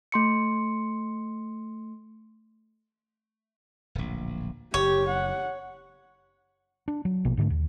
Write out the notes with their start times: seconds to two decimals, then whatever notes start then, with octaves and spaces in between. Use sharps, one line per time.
0.12 A3 C6 C#7
3.95 D1 A#1
4.74 F#1 G4 C#5
5.09 F#5
6.88 D4
7.05 F#3
7.25 A#1 B2 F3 A#3
7.37 G#2 D3 F#3 A3
7.50 D#2